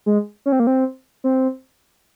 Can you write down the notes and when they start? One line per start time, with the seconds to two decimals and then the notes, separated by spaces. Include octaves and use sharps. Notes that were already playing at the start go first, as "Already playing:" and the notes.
0.06 G#3
0.46 C#4
0.52 C4
0.60 A#3
0.67 C4
1.24 C4